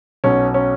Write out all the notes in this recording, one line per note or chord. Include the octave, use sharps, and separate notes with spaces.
B1 B2 C#4
C#4